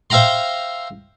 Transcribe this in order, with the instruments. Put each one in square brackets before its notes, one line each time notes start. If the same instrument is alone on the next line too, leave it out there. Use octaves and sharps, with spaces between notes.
[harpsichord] C5 E5 F5 G5 A#5 C6